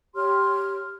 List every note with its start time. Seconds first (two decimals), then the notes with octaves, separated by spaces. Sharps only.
0.15 G4 C#5 C6 F6